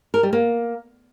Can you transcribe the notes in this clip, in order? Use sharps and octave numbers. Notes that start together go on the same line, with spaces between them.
A#4
G3
A#3